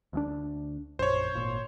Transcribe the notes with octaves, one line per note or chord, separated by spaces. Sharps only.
D2 G#3 D4
A#1 F#2 C5 C#5
G#1 A#2